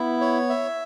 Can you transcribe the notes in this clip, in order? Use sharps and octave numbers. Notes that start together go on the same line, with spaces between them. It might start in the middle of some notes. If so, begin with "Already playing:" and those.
Already playing: B3 E4
C#5
E5